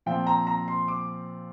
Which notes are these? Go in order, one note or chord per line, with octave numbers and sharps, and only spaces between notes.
A#2 F3 C4 G5
A#5
A#5
C6
D6